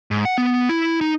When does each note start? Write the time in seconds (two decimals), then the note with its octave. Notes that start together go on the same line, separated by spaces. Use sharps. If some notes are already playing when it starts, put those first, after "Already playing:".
0.11 G#2
0.25 F#5
0.38 B3
0.69 E4
1.01 D#4